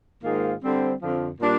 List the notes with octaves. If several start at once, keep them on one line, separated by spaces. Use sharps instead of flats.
G#2 D#3 A#3 F4 G#4
D3 G3 C4
F2 D3 F3
A#2 G3 D4